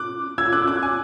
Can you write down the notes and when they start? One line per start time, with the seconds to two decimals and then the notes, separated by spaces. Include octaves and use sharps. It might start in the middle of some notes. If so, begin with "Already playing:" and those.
Already playing: D6 F#6
0.38 E6 G#6
0.53 D6 F#6
0.68 D6 F#6
0.83 G#5